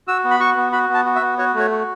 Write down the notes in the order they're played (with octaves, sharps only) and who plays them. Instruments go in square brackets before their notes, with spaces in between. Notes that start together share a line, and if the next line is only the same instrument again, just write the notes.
[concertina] F#4 E6
B3
B5
F#4 C#6
B3
F#4 B5
B3 A5
F#4
E5
B3
F#4 C#5
A3
C#5
F#4